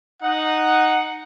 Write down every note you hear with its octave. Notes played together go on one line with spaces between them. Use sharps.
D#4 F#5